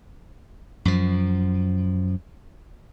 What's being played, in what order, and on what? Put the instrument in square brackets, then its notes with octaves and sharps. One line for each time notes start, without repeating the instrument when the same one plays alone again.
[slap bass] F#2 F3